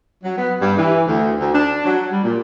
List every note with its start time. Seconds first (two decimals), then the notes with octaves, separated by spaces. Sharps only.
0.24 F#3
0.36 B3
0.61 G2
0.77 E3
1.07 D2
1.40 D2
1.54 D4
1.86 F#3
2.11 G3
2.23 A#2